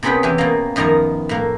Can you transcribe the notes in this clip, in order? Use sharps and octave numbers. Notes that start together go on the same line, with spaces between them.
C3 B3 C#4 G#4 B4 G5
E3 G4 G#5
B2 A#3
F#2 B2 D#3 F3 A#5
A2 A#3